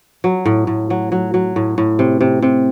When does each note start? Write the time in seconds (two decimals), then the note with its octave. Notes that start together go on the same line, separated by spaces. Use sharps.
0.24 F#3
0.46 A2
0.67 A2
0.90 F#3
1.12 F#3
1.34 F#3
1.56 A2
1.78 A2
1.99 C3
2.21 C3
2.42 C3